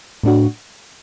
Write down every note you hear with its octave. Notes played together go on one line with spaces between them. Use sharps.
A2 A3 D4 F#4